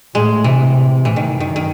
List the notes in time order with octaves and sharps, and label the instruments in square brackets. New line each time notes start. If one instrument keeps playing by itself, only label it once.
[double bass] A2 [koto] G#3
[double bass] C3 [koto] E3
[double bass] A2 [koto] E3
[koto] D#3
[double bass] F#2
[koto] D#3
D#3